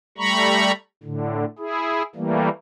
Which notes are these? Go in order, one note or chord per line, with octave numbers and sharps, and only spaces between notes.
G3 A3 A#5 B5 C#6
A2 D3
E4 G#4
E3 G3 A3 A#3